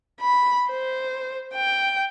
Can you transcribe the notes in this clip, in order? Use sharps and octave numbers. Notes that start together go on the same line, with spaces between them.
B5
C5
G5